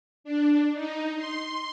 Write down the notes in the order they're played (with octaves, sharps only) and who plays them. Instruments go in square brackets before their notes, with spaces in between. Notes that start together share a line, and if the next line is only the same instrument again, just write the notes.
[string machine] D4
D#4
C6